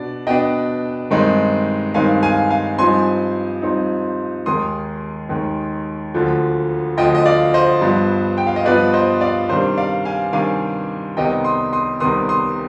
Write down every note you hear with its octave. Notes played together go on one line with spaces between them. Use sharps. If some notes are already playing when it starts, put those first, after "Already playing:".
Already playing: B2 B3 D4 D5
B2 B3 D4 D#5 G5
G2 D#3 G#3 C4 D#4
G2 D#3 G#3 C4 D#4 F5 G#5
F5 G#5
F5 G#5
G2 F3 C4 D#4 G#5 C6
G2 F3 C4 D#4
D#2 D#3 G#3 C6 D#6
D#2 D#3 G#3
D2 D3 F3
D2 D3 F3 D#5 G5
D#5
D5 F5
C5 D#5
G2 F3 B3
G5
F5
D#5
G2 F3 B3 B4 D5
C5 D#5
D5 F5
C3 D#3 G3 D4 C5
D5 F5
F5 G#5
C3 D#3 G3 D4 F5 G#5
C2 C3 D#3 B3 D#5 G5
C6 D#6
C6 D#6
C2 C3 D#3 B3 C6 D#6
C6 D#6